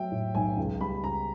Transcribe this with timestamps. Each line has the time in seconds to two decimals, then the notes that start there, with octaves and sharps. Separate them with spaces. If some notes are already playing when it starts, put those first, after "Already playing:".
Already playing: F#3 E5 G5
0.11 A2
0.35 B1 G#5
0.57 C#2
0.80 G3 B5
1.03 C#2 A#5